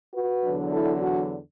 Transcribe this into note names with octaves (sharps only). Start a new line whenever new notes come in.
F#4 B4
E2 D3 F#3 D4
E4 A4
D4 F#4